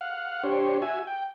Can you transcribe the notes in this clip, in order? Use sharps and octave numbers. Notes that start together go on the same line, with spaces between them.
F5 F#5
D4 G4 C5 C#5
F#4 E5 G#5
G5